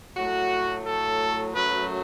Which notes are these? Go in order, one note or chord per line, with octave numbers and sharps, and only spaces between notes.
A2 F#3 A3 F#4
A4
F#2 F#3 A3 B4